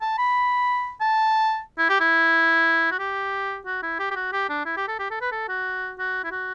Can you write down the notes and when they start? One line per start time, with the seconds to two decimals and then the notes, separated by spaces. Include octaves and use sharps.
0.01 A5
0.18 B5
1.01 A5
1.78 E4
1.89 G4
2.00 E4
2.92 F#4
2.99 G4
3.66 F#4
3.83 E4
3.99 G4
4.11 G4
4.16 F#4
4.33 G4
4.49 D4
4.65 E4
4.77 G4
4.88 A4
4.99 G4
5.11 A4
5.21 B4
5.32 A4
5.49 F#4
5.99 F#4
6.24 E4
6.31 F#4